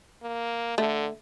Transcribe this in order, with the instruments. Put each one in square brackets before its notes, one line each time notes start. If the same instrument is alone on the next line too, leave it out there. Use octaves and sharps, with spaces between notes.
[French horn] A#3
[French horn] D3 [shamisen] A3